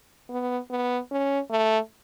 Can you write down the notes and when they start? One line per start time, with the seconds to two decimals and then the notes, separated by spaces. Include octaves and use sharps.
0.30 B3
0.71 B3
1.11 C#4
1.50 A3